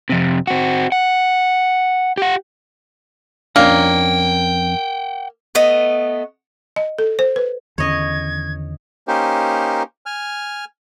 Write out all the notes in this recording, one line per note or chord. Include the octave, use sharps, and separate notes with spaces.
F2 C3
C4 F#4
F#5
G4 F#5
F2 A#3 C#4 D4 F#5 G5
A3 B3 D#5
D#5
A4
C5
B4
E2 D3 D#3 C#4 C#5 D#5 G#6
A#3 C#4 D#4 G4 A#4 C5
G#5 F6